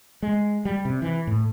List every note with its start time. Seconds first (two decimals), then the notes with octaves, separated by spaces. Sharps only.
0.22 G#3
0.65 G3
0.85 C3
1.02 E3
1.27 A2